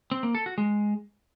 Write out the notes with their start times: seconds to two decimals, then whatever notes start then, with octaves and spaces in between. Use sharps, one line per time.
0.11 C4
0.23 A#3
0.35 A4
0.46 F#4
0.58 G#3